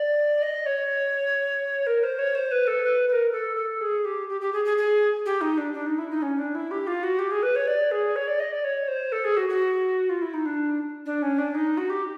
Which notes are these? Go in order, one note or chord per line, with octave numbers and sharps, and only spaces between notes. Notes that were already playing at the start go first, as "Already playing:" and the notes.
Already playing: D5
D#5
C#5
A#4
C5
C#5
C5
B4
A4
B4
B4
A#4
A4
A4
G#4
G4
G4
G4
G#4
G#4
G#4
G4
D#4
D4
D4
D#4
E4
D#4
C#4
D4
E4
G4
F4
F#4
G4
G#4
B4
C#5
D5
G#4
C#5
D5
D#5
D5
C#5
C5
A4
G#4
F#4
F#4
F4
E4
D#4
D4
D4
C#4
D4
D#4
F#4
G4